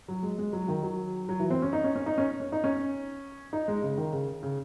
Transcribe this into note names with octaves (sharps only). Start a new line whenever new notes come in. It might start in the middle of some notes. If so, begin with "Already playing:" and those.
F#3
G#3
G#3
F#3
D#3
F#3
F#3
E3
C4
C#4
D#4
C#4
C#4
D#4
C#4
C#4
D#4
C#4
D#4
G#3
C#3
D#3
C#3
C#3